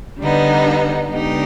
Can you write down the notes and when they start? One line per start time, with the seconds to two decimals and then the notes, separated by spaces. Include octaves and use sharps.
0.19 D3 G3 B3 D#4
1.10 D3 G#3 B3 D#4 G4